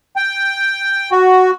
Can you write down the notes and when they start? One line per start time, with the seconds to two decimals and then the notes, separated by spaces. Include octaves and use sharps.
0.16 G5
1.12 F#4